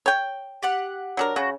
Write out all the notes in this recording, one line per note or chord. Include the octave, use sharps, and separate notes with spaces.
C#5 G5
G4 F#5 F#6
F#3 D4 A#4
C#3 F#4